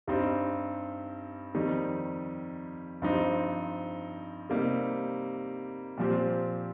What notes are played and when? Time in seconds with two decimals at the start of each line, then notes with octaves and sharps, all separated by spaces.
0.07 G2 G3 C4 D#4
1.54 F2 D#3 G3 D#4
3.02 G2 F3 C4 D#4
4.50 C3 G3 A#3 D#4
5.97 A#2 F3 C4 G4